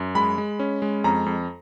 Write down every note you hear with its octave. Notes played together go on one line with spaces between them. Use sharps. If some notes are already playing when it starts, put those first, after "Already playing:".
Already playing: F#2
G#3 B5
G#3
C#4
G#3
F2 A#5
F2